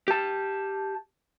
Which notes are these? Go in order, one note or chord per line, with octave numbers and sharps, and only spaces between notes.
G4 A5